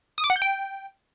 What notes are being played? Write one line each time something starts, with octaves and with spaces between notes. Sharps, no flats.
D#6
D6
F#5
G6
G5